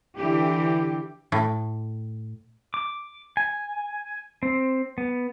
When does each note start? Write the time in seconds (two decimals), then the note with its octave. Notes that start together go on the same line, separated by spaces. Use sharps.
0.18 D3 E3 G4
1.32 A2
2.74 D6
3.37 G#5
4.43 C4
4.98 B3